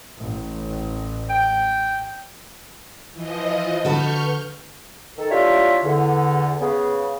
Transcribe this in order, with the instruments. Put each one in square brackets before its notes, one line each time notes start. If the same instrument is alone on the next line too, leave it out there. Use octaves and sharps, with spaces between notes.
[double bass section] A1
[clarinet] G5
[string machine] E3 F3 D#5
[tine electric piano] D3 [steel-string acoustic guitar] F#4 A4 B4 [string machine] C#6 F6 G6
[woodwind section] D#3 A4
D4 E4 F4 G4 C#5 E5
E2 D3
C#3 B3 G#4